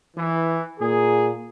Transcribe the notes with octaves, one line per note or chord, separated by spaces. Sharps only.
E3
A#2 G#4